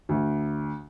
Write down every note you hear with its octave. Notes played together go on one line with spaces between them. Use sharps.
D2